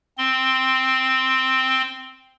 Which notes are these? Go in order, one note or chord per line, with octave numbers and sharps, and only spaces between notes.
C4 C6